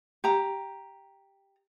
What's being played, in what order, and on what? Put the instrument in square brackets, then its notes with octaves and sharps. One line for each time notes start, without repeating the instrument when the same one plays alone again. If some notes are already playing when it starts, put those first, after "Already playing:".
[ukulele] G4 A#5